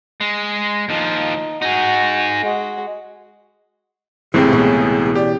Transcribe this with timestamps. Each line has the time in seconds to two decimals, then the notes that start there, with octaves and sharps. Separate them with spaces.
0.21 G#3
0.89 D#2 F3 D#4
1.62 D#4 F#4 G#4
2.41 G#3 F#4
4.34 C#2 A2 C3 E3 C4 G#4
4.53 B2 E3 C#4
5.15 G4 D5